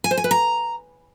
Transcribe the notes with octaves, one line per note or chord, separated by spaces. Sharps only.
G#5
C5
G#5
B4
A#5